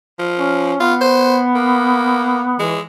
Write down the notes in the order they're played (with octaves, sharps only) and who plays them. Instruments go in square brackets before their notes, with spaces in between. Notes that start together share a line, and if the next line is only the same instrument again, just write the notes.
[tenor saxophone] F3
[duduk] C#4
[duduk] B3 [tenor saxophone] F4
[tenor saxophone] C5
A#3
[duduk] E3 [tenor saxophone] G#3